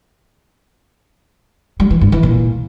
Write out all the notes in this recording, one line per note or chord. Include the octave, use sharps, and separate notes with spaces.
G3
E3
G2
E3
A#2